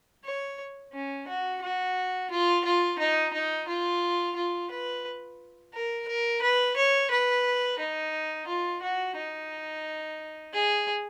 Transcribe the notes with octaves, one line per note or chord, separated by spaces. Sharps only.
C#5
C#4
F#4
F#4
F4
F4
D#4
D#4
F4
F4
B4
A#4
A#4
B4
C#5
B4
D#4
F4
F#4
D#4
G#4